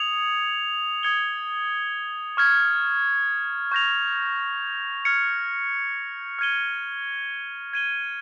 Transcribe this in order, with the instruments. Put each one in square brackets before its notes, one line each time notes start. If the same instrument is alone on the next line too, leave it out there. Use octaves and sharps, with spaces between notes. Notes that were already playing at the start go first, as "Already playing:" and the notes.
Already playing: [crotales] D#6 G#6 C#7 F7
D#6 G#6 C#7 G7
C#6 F6 G#6
C#6 G6 A#6 F7
F6 G#6 C#7
F6 G#6 D#7 G7
G#6 D#7 G7